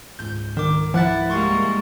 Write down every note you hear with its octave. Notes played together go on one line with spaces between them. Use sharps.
C#2 G#2 G6
D#3 A#4 D6
F3 E4 F#5 F#6 A6
G3 G#3 A#3 C6 C#6 A6